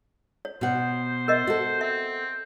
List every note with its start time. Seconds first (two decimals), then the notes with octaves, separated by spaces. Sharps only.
0.45 C#5
0.61 B2 C5 F#5
1.28 A#4 C5 D#5 E5
1.47 F#4 A4
1.81 C4 E5